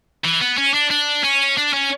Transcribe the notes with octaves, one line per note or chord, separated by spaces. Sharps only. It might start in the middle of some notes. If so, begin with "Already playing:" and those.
E3
B3
C#4
D4
D4
C#4
D4
C#4